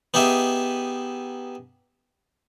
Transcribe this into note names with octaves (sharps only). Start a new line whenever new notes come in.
B3 D#4 G4 G#4 E5